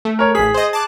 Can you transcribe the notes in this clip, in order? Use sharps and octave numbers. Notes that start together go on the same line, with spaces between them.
A3
A#4 C#5
A1 G#4 B6
C5 D#5
A5 D6 F#6